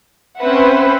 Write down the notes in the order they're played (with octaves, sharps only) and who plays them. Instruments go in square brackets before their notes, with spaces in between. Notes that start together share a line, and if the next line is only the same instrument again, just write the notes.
[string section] C4 C#4 B4 C5 E5 F#5